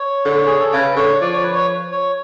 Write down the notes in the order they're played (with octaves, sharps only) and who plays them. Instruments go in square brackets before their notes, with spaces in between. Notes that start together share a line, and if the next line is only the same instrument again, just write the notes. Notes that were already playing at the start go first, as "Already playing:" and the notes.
Already playing: [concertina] C#5
[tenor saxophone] D3
[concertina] G#4
A4
[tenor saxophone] C#3 [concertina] B4
[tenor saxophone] D3 [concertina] C#5
[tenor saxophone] F3 [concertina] D5
[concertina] C#5
B4
C#5
C#5